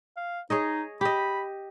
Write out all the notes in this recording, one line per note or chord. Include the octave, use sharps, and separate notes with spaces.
F5
D#4 G#4 C#5 D#5
G4 D#5 B5